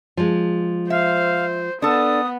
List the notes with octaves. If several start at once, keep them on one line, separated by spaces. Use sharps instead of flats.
F3 G#3
C5 E5 F5
B3 D4 A4 D#6